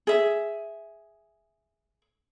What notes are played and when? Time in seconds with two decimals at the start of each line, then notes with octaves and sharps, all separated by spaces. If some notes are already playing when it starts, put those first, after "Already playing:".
0.07 G#4 E5